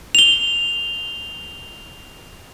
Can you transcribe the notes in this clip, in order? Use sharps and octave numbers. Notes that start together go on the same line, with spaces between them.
F7 G7